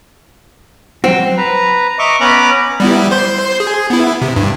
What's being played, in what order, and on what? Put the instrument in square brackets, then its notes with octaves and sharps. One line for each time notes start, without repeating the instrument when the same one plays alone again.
[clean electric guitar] F#3 F#4 [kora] C4
[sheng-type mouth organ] B4 A#5
D#5 E5 A#5 C#6 D6
B3 C#4 B4 A#5 B5 D6
[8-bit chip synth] G3 B3 E4
C5 C6 G6
G#4
B3 E4
C3
G2